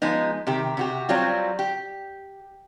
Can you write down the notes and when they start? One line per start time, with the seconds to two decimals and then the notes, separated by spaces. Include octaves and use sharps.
0.02 F3 G#3 B3 D#4
0.47 C3 D#3 G4
0.77 C3 F#4 G4
1.09 F#3 G3 C4 F4
1.59 G4